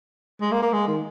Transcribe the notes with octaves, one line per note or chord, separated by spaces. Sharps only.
G#3
A#3
A#3
G#3
D#3